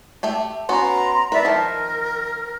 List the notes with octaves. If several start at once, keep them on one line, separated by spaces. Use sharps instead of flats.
A3 G4 E5
B3 C#4 F#4 A#5 C6
A#4 B4 D5 E5 A#5
D#3 F3 A#4